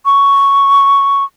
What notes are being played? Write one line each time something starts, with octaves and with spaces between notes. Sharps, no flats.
C#6